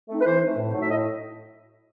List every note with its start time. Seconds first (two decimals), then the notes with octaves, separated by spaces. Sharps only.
0.09 A3 C4 D#4
0.21 B4
0.26 E3 C5
0.42 A3 C4 D#4
0.57 A2
0.73 F#3 A3 D#4
0.81 E5
0.90 A2 D#5